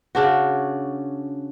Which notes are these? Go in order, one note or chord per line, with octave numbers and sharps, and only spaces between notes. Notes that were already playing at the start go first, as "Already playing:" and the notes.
C#3 D4 F#4